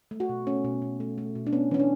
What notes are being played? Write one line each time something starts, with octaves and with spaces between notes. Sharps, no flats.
A3
F#4
B2
A3 C#4
B2
B2
A3
A3
B2
D4
B3 C#4
E3 C#4
D4